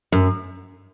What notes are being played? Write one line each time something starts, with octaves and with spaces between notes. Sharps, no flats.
F#2